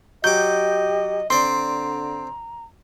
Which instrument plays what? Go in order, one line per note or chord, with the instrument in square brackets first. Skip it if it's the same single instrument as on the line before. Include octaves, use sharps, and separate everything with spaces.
[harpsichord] F#3 D6 [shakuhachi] G4 [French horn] D#5 [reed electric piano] G6
[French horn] D3 [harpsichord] C4 D5 [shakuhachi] A#5 [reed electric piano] C6